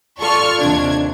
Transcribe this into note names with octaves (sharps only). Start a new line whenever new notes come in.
F4 A4 D5 C#6 F6
D#2 C3 D4 G#6